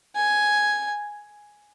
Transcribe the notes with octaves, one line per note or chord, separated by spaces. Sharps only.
G#5